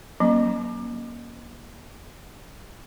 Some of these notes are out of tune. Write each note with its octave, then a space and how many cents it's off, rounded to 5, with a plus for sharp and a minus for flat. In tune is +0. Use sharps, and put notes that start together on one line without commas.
F#3 +0 A#3 +25 C#4 -5